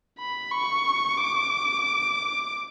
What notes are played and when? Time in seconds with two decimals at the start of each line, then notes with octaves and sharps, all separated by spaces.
0.19 B5
0.51 C#6
1.18 D6